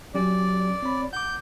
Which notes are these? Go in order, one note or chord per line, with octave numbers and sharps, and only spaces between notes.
F#3 C#4 G4 D5
C4 C#5 B5
F#5 D6 G6